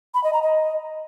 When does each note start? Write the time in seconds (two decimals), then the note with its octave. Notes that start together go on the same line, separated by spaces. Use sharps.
0.14 B5
0.24 D#5
0.33 A#5
0.43 D#5